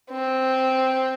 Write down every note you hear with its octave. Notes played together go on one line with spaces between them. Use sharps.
C4